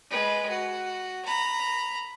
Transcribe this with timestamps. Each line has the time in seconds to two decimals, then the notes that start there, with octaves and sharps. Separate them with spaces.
0.10 G#3 B4
0.49 F#4
1.25 A#5 B5